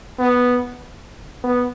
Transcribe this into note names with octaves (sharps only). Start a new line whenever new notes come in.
B3
B3